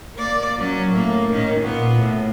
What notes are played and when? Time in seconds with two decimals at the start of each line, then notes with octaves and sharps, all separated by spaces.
0.15 A#3 D5
0.59 F#3 C#4
0.92 A2 A#3
1.31 D#3 C#4
1.62 A#2 B3
2.00 A2